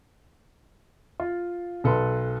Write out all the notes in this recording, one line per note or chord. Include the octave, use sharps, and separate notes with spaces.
F4
B1 A4 B4 C6